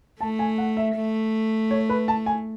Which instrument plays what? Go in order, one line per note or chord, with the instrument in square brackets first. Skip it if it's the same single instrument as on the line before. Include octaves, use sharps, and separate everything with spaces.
[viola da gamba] A3 [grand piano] A5
[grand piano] G#5
F#5
E5
[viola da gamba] A3
[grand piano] C#5
B4
A5
G#5